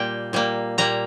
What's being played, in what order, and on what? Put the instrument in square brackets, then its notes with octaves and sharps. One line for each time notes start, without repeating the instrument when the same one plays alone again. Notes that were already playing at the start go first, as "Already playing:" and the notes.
Already playing: [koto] A#2 G3 A#3 G5
A#2 G3 A#3
A#2 G3 A#3 A#5